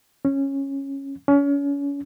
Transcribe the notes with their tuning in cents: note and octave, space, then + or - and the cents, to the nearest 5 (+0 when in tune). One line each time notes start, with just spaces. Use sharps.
C#4 -10
C#4 +35